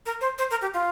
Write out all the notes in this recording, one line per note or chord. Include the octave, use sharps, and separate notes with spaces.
A#4
C5
C5
A#4
G4
F4